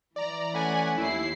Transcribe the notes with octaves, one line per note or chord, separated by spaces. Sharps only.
E3 D5 A#5
A3 C#4 D5 F#5 G#5 B5
D#2 E4 C7